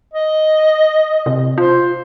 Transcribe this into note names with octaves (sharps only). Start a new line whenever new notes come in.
D#5
C3
F4 C5